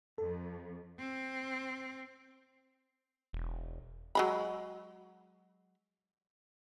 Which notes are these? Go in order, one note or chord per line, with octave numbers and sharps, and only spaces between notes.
F2 A4
C4
E1
F#3 G#3 B5